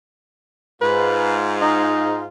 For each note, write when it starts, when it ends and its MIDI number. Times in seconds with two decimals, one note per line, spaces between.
0.81 2.25 44
0.81 2.25 65
0.81 1.36 71
1.61 2.23 63